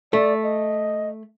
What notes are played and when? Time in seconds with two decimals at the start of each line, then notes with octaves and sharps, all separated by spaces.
0.13 A3 D5
0.43 D#5